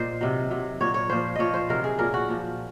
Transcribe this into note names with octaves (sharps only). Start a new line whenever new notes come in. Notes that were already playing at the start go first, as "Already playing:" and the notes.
Already playing: A#2 C5 D#5
C3 D#3 F#3
C3 F#3
A#2 F#3 C#5
C#5
A#2 F3 C5
A#2 F3 C#5 D#5
C5
C3 D#3 F#3 A#4
G#4
A#2 F#3 A#4
F#4
A#2 F3